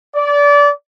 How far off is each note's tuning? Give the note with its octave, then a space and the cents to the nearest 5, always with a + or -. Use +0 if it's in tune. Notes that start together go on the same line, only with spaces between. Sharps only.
D5 -25